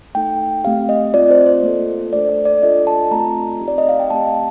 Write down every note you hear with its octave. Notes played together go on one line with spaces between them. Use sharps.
A3 D#4 A4 G5
A3 C4 G4 F5
D#5
A3 C4 F4 D5
C5
C5
A#3 F4 A4
A3 D4 A4 D5
D5
D5
D4 F4 A4 D#5
A5
A3 C4 F4 A4 A#5
C4 D#4 G4
D5
D#5
F5
G5
A3 C4 G4 A5
F5